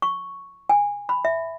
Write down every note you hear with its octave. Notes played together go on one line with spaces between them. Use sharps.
C#6
G#5
B5
E5